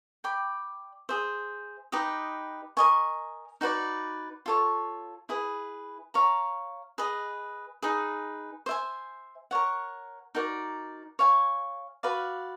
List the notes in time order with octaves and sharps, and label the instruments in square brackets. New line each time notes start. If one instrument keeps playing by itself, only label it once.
[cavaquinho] D5 G5 B5
G#4 C5 E5
D#4 G4 B4 D#5
A#4 D#5 G#5 C#6
D#4 F#4 B4 D5
F4 A4 C#5
E4 G#4 B4
C#5 F5 A#5
G#4 B4 D#5
D#4 G#4 B4
C5 E5 G#5
A#4 C#5 F#5
D#4 F#4 A#4 D5
C#5 F5 G#5
F#4 B4 D5 F5